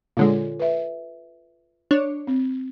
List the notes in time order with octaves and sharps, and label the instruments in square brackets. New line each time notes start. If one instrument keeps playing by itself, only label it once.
[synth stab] A#2 D3 G#3 [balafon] F4 A4 C#5
[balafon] B4 E5
[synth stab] D4 C#5
[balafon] C4